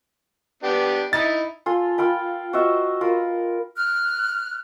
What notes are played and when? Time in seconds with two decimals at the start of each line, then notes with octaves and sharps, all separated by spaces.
0.63 B3 D4 G4
1.13 D#4 E4 A6
1.66 F4 A4 G#5 C6
1.98 F4 F5 G5 B5
2.53 F#4 C5 D#5 E5
3.01 F4 A#4 B4
3.76 F6 F#6